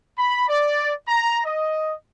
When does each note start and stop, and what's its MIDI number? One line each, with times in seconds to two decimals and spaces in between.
0.18 0.44 83
0.48 0.92 74
1.08 1.39 82
1.45 1.93 75